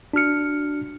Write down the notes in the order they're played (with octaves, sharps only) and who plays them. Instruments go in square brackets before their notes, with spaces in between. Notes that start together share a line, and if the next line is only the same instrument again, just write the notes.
[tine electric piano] D4 F#4 F6 C#7